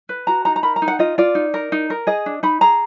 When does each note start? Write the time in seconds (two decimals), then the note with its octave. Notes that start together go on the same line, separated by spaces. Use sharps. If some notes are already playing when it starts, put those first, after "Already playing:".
0.09 B4
0.27 F#4 A#5
0.45 D#4 A#5
0.56 A#5
0.63 A#4 B5
0.76 A#5
0.82 D#4
0.88 F#5
0.99 F4 D#5
1.18 F4 D5
1.35 D#4
1.54 A#4
1.72 D#4
1.90 A#4
2.07 G#4 D#5
2.26 D4
2.43 D#4 B5
2.61 G#4 A#5